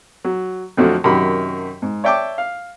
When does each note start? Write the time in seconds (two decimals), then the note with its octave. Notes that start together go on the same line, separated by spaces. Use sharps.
0.24 F#3
0.77 F2 D3 F3 F#3 A3
1.04 F#2 C3 D#3 F#3 G4 B5
1.82 G#2
2.04 C#5 D5 E5 G5 A5 D6
2.38 F5